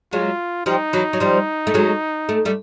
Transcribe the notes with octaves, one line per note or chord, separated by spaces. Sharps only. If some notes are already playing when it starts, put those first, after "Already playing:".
F#3 G#3 F4
F3 G3 D#4
E3 F#3
F#3
F3 G3
A3
F#3 G#3
A3
G3 A3